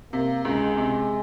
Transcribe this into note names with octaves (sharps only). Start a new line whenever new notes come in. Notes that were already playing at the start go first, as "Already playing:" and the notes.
C3 A#3
C#2 G#3
C3